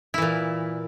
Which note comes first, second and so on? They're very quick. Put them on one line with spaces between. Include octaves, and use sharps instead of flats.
E4 E3 A#2